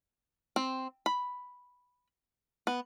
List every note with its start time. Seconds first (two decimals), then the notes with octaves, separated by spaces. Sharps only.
0.56 C4
1.06 B5
2.67 B3